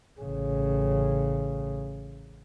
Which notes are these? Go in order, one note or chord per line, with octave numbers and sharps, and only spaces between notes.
A1 C#3